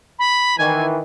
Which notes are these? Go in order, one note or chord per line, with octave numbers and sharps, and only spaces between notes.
B5
D#3 E3 G#5